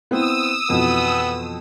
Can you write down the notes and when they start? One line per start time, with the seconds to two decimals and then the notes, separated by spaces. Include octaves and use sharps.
0.11 B3 C4 E4 D#6 E6
0.70 F2 B2 E3 B3